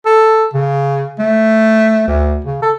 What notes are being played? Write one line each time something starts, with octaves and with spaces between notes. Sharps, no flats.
A4
C#3
A3
D2
C#3
A4